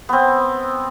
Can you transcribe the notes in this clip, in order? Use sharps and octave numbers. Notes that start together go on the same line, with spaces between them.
B3 C4